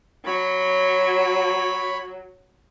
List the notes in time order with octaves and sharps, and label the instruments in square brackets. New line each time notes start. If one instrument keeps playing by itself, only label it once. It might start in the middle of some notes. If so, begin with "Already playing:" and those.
[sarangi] F#3 [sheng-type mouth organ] C#5 B5